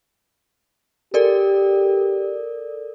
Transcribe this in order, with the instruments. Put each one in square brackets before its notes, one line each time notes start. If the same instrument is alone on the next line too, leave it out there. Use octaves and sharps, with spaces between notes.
[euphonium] G4 [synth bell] A4 A#4 D5